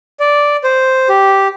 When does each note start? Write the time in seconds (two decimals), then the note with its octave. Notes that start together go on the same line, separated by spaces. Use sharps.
0.20 D5
0.64 C5
1.09 G4